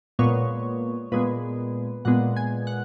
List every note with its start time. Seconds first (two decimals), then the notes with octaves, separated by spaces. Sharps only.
0.19 A#2 G#3 B3 C#5
1.12 A#2 G#3 B3 B4
2.05 A#2 G#3 B3 F#5
2.36 G#5
2.67 F#5